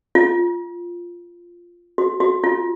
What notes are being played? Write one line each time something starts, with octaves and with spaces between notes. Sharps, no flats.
F4
F#4
F#4
F4